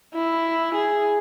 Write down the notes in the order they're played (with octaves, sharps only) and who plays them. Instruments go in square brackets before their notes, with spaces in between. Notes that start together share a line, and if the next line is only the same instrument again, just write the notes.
[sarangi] E4
G#4